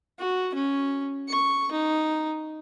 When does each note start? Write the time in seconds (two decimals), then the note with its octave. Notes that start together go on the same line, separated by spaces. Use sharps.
0.19 F#4
0.55 C#4
1.29 C#6
1.72 D#4